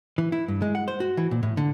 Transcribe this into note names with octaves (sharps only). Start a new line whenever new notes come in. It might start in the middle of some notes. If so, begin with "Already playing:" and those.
E3
E4
G2
G#3
F#5
C5
F#4
E3
A#2
A2
D3